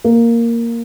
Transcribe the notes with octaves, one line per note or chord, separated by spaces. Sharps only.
A#3